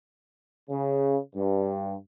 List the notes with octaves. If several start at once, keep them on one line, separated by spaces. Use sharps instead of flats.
C#3
G2